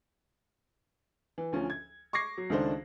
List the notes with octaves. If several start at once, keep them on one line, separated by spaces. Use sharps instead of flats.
E3
D2 F3 C#4
G#6
C#6 D6 G#6 A#6 C7
F#3
C#2 D#3 A3 D4 C5